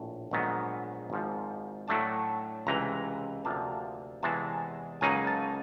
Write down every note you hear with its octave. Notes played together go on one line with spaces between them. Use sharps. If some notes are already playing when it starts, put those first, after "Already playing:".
Already playing: A#1 A2
A#1 G#2 D#3 F#3 B3
G#1 G#2 F3
A2 F#3 A3 D4 A5
C#2 C3 E3 A#5
D2 C3 F3 A#3 A5
E2 C3 E3 G#3 A5
C#2 C#3 F#3 A#3 D#4 G#5
A5